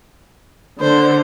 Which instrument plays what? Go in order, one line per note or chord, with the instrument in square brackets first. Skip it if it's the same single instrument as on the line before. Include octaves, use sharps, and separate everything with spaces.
[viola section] D3 [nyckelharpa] C5